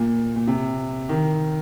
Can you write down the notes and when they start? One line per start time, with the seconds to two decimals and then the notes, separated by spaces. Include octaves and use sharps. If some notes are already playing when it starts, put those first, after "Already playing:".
Already playing: A#2
0.36 A#2
0.47 C3
1.09 D#3